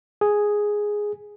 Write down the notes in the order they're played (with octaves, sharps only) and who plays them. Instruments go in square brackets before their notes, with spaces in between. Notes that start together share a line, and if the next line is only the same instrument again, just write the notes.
[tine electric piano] G#4